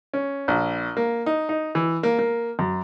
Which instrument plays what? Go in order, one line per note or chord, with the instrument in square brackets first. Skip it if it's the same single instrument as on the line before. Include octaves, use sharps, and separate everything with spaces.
[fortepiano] C#4
A#1
A#3
D#4
D#4
E3
A#3
A#3
F#2